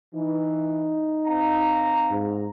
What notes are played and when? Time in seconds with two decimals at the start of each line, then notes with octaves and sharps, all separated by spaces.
0.15 E3 D#4
1.27 C4 F5 A#5
2.12 G#2